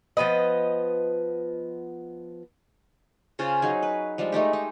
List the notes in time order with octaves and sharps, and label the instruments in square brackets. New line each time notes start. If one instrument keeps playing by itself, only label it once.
[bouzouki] F3 B3 B4 D#5
[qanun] C#3 C#4 F4 C5
F#3 D#4 G#4
B4
F3 G3 G#3 D4
G#3 A3 D#4 G4
D#4